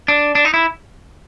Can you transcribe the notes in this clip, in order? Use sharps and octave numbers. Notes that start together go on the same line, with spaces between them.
D4
D4
D#4
E4